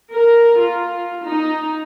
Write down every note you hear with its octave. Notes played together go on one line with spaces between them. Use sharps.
A#4
F4
D#4